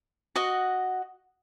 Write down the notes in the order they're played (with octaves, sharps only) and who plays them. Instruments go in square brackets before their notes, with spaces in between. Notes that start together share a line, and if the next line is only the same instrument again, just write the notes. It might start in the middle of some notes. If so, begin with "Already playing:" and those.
[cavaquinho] F#4 D#5 F#5